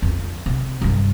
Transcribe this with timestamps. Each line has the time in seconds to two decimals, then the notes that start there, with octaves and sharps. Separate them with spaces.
0.02 F2
0.46 C3
0.81 G2 C3